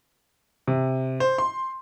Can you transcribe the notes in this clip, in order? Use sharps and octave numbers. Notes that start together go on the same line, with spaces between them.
C3
C5
C6